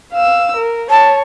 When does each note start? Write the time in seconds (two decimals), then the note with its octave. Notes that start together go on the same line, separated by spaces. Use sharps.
0.12 F5 E6
0.57 A#4
0.90 C#5 A5